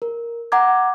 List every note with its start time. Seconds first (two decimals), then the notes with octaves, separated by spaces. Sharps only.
0.02 A#4
0.52 F#5 A#5 D6 G#6